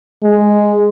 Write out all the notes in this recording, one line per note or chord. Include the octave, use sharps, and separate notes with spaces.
G#3